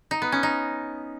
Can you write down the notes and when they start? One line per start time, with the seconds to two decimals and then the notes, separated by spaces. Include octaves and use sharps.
0.11 D#4
0.22 B3
0.32 C#4
0.43 D#4